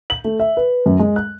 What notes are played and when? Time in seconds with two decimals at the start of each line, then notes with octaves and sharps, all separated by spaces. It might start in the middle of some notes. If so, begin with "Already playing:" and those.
0.10 F#7
0.24 A3
0.40 E5
0.57 B4
0.86 F#2
0.99 G#3
1.16 F#6